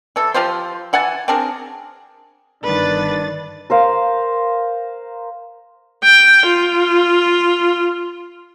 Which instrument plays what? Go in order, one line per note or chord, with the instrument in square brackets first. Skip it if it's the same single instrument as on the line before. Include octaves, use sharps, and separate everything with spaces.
[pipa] E3 A4
F3 F4 G4 C5
E3 F#5 G#5 A5
C4 D4 G#4 A#4
[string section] G1 D#3 A6 [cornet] D4 [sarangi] B4
[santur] A#4 C5 F5
[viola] G5
F4